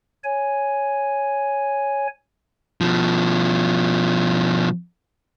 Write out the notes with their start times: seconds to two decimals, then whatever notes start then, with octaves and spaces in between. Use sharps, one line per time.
0.24 C#5 G#5
2.81 B2 F3